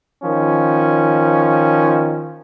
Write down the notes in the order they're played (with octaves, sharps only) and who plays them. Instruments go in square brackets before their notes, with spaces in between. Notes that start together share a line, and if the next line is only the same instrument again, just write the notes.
[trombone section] D#3 F3 C#4